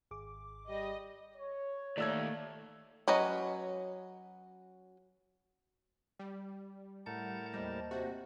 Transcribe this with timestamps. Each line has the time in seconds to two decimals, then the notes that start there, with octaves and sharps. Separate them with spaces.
0.11 G#1 G#4 D6
0.69 G3 D#5
1.35 C#5
1.98 D#2 A3 D5 E6 G#6
3.08 F#3 C#4 B4 D#5
6.19 G3
7.06 A2 A#4 F#5 A5 G6
7.53 D#2 G3 C5 D#5
7.91 C3 F#4